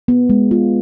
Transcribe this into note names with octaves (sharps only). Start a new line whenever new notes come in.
B3
G#3
F4